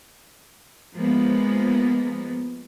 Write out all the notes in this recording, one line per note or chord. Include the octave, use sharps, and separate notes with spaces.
F3 G#3 A#3 B3